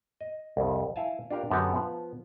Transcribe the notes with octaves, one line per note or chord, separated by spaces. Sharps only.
D#5
C2 F2
E4 F5 G#5 A5
D4 F4 G4 A#4
F#2 D3 B3 F#4 G4 A4
F3 B3